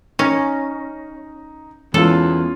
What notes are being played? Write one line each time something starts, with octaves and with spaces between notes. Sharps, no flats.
C#4 D#4 A#6
E2 E3 G#3 B3 C#4 F4 A4